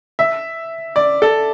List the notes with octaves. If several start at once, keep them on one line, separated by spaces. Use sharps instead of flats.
E5
D5
A4